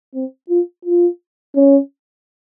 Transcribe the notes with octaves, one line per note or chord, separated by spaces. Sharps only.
C4
F4
F4
C#4